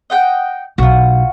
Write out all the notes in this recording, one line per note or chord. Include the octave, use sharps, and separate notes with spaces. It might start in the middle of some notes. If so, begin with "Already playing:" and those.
D#5 F#5 G5
B1 F4 F#4